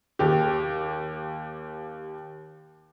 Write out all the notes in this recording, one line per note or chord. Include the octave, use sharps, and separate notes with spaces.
D#2 G4